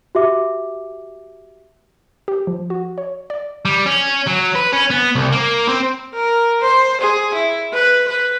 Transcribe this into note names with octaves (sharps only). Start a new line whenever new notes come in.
F#4 G4 E5 D6
G4
F3
F#4
C#5
D5
G3
C#4
F#3
B4
C#4
B3
C2
A#3
C4
A#4
C5
G#4
E4
B4
B4